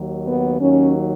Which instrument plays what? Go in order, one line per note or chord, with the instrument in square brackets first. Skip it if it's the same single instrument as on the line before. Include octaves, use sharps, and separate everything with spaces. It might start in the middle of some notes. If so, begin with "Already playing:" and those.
Already playing: [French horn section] D#2 D#3 F#3
B3
D#2 D#3 F#3 C#4